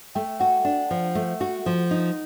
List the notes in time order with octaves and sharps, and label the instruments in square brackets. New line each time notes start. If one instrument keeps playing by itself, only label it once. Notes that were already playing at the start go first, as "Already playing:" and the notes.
[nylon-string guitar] A3 [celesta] G5
[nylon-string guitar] F#4 [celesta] F#5
[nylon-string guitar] D4
F3
A3
F#4
F3
D#4